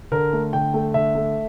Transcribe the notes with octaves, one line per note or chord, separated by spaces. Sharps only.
D3 A#4
A3
D3 G5
A3
D3 E5
A3